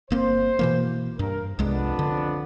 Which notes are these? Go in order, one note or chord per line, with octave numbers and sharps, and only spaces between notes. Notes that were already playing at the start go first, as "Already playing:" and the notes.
G1 A#3 C4 C5
B2 E3 A#3
G2 A#4
C2 F2 G#3 B3 D4
D3